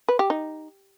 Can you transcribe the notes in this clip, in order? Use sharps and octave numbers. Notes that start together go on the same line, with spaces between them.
B4
G4
D#4